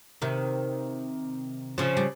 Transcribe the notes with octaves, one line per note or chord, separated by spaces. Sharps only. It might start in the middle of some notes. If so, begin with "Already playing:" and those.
C3 D#3
C#3 F3
G3